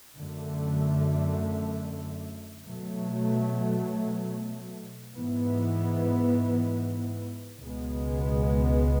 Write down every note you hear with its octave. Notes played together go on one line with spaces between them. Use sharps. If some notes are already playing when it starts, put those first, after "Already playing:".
F#2 D3 A3
B2 F#3 A3
G#2 E3 B3
C#2 B2 G#3 B3